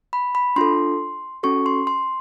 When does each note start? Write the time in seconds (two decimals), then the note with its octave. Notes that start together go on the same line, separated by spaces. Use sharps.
0.13 B5
0.35 B5
0.56 D4 F4 A4 C6
1.43 C#4 F#4 A4 C#6
1.66 C6
1.87 C6